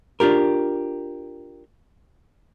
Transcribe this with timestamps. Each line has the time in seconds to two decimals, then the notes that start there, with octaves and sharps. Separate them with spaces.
0.20 D4 F4 G4 A#4